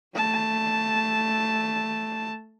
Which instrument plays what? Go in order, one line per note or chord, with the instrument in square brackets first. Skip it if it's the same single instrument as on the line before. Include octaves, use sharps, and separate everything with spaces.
[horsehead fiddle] A3 A5